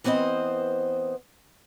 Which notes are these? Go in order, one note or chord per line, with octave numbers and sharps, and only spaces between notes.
E3 B3 C4 C5 D#5